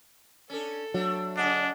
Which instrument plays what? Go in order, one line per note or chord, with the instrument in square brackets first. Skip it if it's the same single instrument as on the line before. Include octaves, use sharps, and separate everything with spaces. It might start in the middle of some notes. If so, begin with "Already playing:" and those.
[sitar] C#4 D4 [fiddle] A4
[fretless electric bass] F#3 [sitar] A3 D4
[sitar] C#3 A#3 D#5 [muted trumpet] D4 [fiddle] G#4 F#5